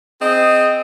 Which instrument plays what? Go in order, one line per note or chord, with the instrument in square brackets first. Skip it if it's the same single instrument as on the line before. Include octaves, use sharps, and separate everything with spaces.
[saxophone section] C4 G#4 D#5